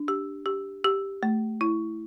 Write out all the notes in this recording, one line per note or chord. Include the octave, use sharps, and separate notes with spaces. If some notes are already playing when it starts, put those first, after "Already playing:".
Already playing: D4
G4
G4
G4
A3
E4